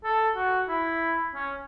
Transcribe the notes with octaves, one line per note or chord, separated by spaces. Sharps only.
A4
F#4
E4
C#4